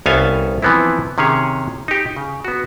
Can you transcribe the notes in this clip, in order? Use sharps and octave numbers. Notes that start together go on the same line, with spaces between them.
C2 B3 C#4 A4 F5 G#5
E3 F3 B3 C4 E4
C3 D#3 C#4 G#4 C#5
D#4 G4
C#3
B3 F#4